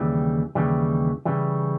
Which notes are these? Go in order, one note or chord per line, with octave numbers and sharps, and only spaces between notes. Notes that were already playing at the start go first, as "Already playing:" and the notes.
Already playing: D#2 C#3 E3 G3
D#2 C#3 E3 G3
C#3 E3 G3